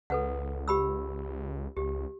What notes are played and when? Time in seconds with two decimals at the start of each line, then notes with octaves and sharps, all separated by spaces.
0.10 C#2 A4 B4 F#5
0.68 G4 B5 E6
1.77 C#2 G4